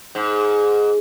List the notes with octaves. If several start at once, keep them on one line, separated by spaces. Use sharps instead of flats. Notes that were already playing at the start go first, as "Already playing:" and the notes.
G#2